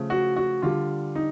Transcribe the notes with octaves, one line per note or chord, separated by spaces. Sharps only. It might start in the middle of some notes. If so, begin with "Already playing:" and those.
Already playing: C#3 F3 A3
F#4
F#4
D3 G3 F4
D#4